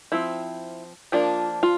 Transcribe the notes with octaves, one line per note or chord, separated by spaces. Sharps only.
F3 C4 E4
F3 A#3 D4 F4
F4